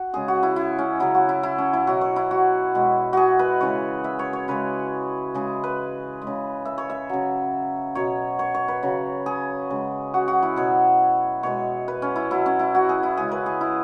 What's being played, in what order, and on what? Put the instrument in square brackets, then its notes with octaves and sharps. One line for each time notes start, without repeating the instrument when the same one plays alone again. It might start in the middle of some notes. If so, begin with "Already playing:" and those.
Already playing: [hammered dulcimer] F#4
C#3 G#3 G#4
F#4
E4
E4
C#4
C#3 F#3 E4
F#4
E4
E4
C#4
E4
B2 F#3 F#4
C#5
E4
F#4
B2 G#3
F#4 G#4
B4
C#3 E3 G#3 C#5
E5
C#5
C#5
C#3 G#3 B4
C#3 G#3 G#4
B4
G#3
C#3
E5
C#5
E5
C#3 F#3
B2 F#3 C#5
C#5
C#5
B4
C#3 F#3
G#4
C#3 G#3
F#4
F#4
E4
B2 F#3 C#5
B2 G#3 C#5
B4
C#4
E4
B2 F#3 E4
C#4
E4
F#4
G#4
E4
C#3 G#3 G#4
B4
G#4
E4